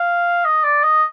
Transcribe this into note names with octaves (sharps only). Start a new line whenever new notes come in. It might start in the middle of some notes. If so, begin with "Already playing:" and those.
Already playing: F5
D#5
D5
D#5